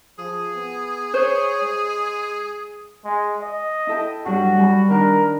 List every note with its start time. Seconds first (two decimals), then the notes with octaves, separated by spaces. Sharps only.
0.19 F3 G#4
0.55 B3
1.14 C5 C#5
1.62 G#3
3.05 G#3
3.42 D#5
3.87 E4 A4 G5
4.26 G2 F#3 G3 F#4
4.57 G3 G#5 B5
4.89 D#3 D4 A#4 F#6